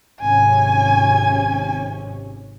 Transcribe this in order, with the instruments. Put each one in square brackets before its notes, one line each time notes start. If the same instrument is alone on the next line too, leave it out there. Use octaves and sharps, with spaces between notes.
[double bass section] G#1 C3 C#4 [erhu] G#5